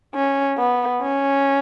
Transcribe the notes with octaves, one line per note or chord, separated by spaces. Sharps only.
C#4
B3
C#4